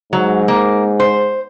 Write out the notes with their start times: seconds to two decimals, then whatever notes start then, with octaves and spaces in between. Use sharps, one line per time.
0.13 G#2 F#3
0.48 A#3
1.00 C5